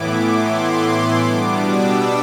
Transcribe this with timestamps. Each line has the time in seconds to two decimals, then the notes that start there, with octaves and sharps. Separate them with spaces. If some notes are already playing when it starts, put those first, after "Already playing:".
Already playing: A2 E3 B3 E4 D6
0.29 C6
1.17 B2 G3 B3 D4 D6
1.60 E6